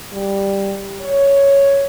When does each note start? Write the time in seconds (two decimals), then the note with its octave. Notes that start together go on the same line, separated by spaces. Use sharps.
0.13 G3
1.02 C#5